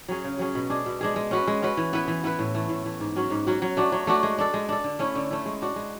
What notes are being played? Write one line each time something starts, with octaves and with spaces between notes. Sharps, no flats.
F#3 C#4 G#4
C#3
F#3 C#4 G#4
B2
G#3 D4 G#4
B2
G#3 D4 G#4
G#3
C#4 F#4 B4
G#3
C#4 F#4 B4
E3
B3 E4 B4
E3
B3 E4 B4
A2
E3 A3
A2
E3 A3
G#2
F#3 C#4 F#4
G#2
F#3 C#4 F#4
F#3
A3 D4 F#4
F#3
A3 D4 F#4
G#3
D4 A4
G#3
D4 A4
D3
A3 C#4 E4
D3
A3 C#4 E4
G#3
D4 F#4
G#3